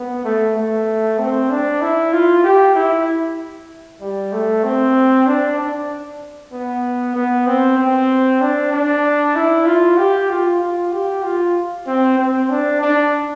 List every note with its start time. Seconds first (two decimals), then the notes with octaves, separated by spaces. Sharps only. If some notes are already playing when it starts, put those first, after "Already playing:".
Already playing: B3
0.24 A3
0.56 A3
1.19 C4
1.50 D4
1.81 E4
2.13 F4
2.44 G4
2.75 E4
4.01 G3
4.32 A3
4.64 C4
5.26 D4
5.58 D4
6.52 B3
7.15 B3
7.47 C4
7.78 C4
8.41 D4
8.73 D4
9.35 E4
9.66 F4
9.98 G4
10.30 F4
10.60 F4
10.92 G4
11.23 F4
11.86 C4
12.18 C4
12.50 D4
12.81 D4